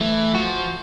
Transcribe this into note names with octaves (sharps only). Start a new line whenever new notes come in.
E3 A3
F3 F#4